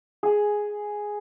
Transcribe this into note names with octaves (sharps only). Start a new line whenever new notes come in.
G#4